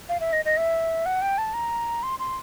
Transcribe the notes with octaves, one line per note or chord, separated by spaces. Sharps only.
F5
E5
D#5
D#5
E5
F#5
G5
A5
A#5
C6
C6